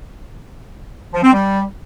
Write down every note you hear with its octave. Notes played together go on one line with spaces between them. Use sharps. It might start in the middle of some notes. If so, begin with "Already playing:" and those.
F3
C4
G3